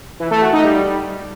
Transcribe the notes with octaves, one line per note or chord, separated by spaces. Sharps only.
E3
A3
F#4
D#4
G3